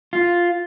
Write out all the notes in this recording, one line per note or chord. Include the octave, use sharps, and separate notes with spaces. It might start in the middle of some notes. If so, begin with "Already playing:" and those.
F4